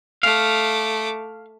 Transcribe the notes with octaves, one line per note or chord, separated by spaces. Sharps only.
A3 F5 D6